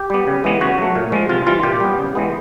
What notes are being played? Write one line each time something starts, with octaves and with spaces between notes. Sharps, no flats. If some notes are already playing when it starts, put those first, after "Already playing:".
Already playing: G4
G3 B3
C#3
E3 G#3 B3
C#3 F#4
F#3 A3
A#2
F3 G#3
C3 F4
E3 G3 F4
A#2 G4
G3 B3
C#3
E3 G#3 B3